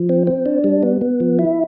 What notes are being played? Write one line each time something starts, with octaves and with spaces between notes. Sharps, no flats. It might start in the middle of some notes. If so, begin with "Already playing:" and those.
Already playing: F3
C4
C4
D4
G3
B3
B3
F3
E4